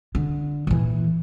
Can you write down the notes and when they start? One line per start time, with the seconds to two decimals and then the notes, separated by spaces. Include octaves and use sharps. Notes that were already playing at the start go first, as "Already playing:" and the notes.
0.15 D3
0.67 A#2 E3